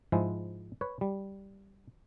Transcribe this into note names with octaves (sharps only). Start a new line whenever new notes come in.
G#2 F3 G#3 E4
B4 C#5
G3